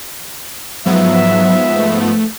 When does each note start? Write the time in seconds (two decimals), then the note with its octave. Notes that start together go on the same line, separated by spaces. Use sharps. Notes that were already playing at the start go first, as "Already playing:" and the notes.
0.86 G#2 F3 F#3 B3 E5
1.79 A3